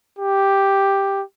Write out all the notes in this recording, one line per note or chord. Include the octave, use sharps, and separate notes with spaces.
G4